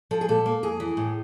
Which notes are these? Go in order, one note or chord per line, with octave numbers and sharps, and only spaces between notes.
F3 A4
G#4
A#2 A4
A#3
F2 G#4
E3
A2